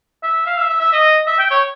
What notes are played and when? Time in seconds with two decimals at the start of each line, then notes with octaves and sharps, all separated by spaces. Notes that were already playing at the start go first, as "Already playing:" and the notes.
0.23 E5
0.46 F5
0.58 E5
0.69 E5
0.80 E5
0.93 D#5
1.27 E5
1.39 G5
1.51 C#5